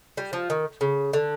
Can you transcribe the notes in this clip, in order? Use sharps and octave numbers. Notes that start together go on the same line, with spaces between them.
G3
F3
D#3
C#3
D3